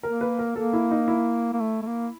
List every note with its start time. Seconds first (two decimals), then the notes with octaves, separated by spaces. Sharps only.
0.03 A#3 A#4
0.21 B4
0.39 A#4
0.56 A#3 A4
0.73 E4
0.91 D#4
1.08 E4
1.53 A#3
1.60 A3
1.82 A3
1.87 A#3